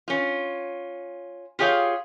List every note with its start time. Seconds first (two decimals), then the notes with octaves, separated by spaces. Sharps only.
0.08 C#4 F4
1.59 F4 G4 G#4 C#5 F5